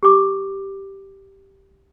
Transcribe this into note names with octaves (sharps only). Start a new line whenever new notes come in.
G4 D6